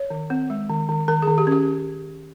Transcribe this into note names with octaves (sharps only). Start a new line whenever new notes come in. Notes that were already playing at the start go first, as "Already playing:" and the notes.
Already playing: C#5
D#3
C4
G#3
D#3
D#3
D#3 A#4
D#3 G#4
G4
C#4
G4